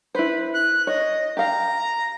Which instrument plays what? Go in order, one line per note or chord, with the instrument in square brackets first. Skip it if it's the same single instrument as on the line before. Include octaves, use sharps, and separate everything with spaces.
[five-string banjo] E4 C5 [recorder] B4
[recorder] F#6
[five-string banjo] C#5 [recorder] D#5
[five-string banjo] G4 F5 [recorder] A#5